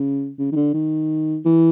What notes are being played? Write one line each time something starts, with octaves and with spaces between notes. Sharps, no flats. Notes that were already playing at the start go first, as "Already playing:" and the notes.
Already playing: C#3
C#3
D#3
D3
D#3
E3